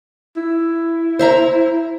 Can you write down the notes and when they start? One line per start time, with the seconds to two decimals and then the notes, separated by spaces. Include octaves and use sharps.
0.36 E4
1.19 C5 E5 A#5